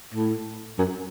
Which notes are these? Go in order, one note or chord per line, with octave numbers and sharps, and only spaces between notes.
A2
F#2